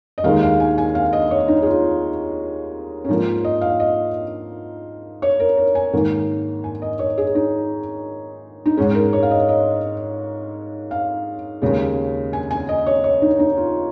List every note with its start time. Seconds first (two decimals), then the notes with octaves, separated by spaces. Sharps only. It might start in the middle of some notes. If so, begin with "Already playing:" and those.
0.18 D#5
0.24 D#2 D#3 G#3 F5
0.43 F5
0.60 G#5
0.78 G#5
0.95 F5
1.13 D#5
1.31 C#5
1.48 D#4
1.62 G#4
1.66 F4
3.04 C#4
3.08 G#2 F3 A#3 D#4
3.44 D#5
3.61 F5
3.80 D#5
5.22 C#5
5.40 A#4
5.57 A#4
5.75 G#5
5.93 G#2 D#3 A#3
6.64 G#5
6.82 D#5
6.99 C#5
7.18 G#4
7.35 D#4
8.66 D#4
8.77 G#2 G#3 C#4
8.95 A#4
9.13 C#5
9.23 F5
9.31 D#5
9.49 D#5
10.91 F5
11.62 D#2 C#3 G#3
12.33 G#5
12.51 G#5
12.69 D#5
12.86 C#5
13.04 C#5
13.22 D#4
13.39 D#4
13.57 F4